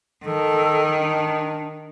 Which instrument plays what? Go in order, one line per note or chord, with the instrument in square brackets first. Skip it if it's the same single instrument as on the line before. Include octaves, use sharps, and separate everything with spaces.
[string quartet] D#3 [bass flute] A4
[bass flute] D4